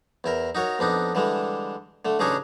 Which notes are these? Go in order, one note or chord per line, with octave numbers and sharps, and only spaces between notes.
E2 E4 A#4
D#4 F#4 A#4 C#5
F2 B3 D4 D#4
D3 E3 G3 G#3
D3 A3
A1 C#3 D4 D#4 G#4 C#5